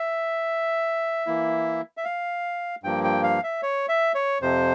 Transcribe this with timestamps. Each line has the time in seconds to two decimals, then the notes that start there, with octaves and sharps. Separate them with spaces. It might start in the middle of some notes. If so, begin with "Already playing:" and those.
Already playing: E5
1.27 E3 A#3 E4
1.97 E5
2.05 F5
2.83 G2 F3 A#3 G5
3.04 G5
3.23 F5
3.43 E5
3.62 C#5
3.89 E5
4.15 C#5
4.41 F2 C3 F3 C5